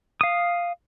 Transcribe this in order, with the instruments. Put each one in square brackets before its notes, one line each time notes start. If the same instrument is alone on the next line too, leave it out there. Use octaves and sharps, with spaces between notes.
[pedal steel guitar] F5 D#6